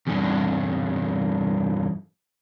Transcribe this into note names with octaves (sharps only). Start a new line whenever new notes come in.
E2 G2